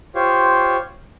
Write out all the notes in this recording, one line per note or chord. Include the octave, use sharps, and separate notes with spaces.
F4 G4 C5 C#5